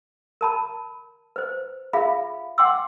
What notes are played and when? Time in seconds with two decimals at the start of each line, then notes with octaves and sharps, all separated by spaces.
0.41 A#4 A5 B5
1.36 B4 C5
1.93 F4 G#4 E5 F5 B5
2.58 F#5 G5 C6 D6 E6